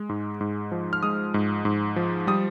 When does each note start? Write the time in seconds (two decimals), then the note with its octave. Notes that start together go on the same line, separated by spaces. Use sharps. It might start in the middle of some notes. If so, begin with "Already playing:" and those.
Already playing: G#3
0.09 G#2
0.41 G#2
0.72 F3
0.93 F6
1.03 G#3 D#6
1.34 G#2
1.65 G#2
1.96 F3
2.27 G3 D#6